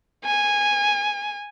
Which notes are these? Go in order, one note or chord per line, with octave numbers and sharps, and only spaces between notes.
G#5